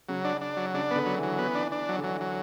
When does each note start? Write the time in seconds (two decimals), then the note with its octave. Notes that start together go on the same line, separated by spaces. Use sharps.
0.08 C#3 F#3
0.25 D4
0.41 D4
0.57 F#3
0.74 C#3 D4
0.91 D3 B3
1.06 F#3
1.18 E3 F#3
1.39 B3
1.55 D4
1.72 D4
1.89 F#3
1.98 D3
2.04 E3 F#3
2.21 F#3